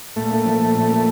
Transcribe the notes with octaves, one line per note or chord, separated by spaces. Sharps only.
A#2 A3
A#3
F3
A#2
A#2
A#3